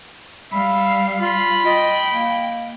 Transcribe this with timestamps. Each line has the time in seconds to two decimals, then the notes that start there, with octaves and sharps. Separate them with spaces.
0.52 G3 E5 F5 B5
1.20 F4 B5
1.66 D#5 G5
2.14 A#3